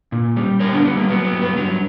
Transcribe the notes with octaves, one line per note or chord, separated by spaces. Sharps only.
A#2
G3
G3 A#4 C#5
B3 D4
G3 B3
A#3
F#3 B3
B3
G2
B3
F#3